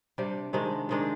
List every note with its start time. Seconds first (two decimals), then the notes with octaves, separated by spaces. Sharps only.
0.18 C3 G3 D4 G4
0.53 C3 D#3 G#3 D4
0.89 C3 D#3 G#3 D4